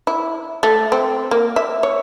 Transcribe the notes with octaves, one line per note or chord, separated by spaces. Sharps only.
E4
A3
C4
A#3
E5
C#5